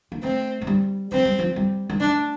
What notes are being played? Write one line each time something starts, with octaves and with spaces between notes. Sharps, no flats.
A#3
A3 C4
A3
G3
F3 C4
G3
F3
G3
G3
A3 D4